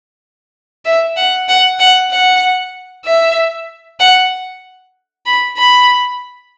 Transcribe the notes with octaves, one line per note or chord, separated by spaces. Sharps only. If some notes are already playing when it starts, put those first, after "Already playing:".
E5
F#5
F#5
F#5
F#5
E5
F#5
B5
B5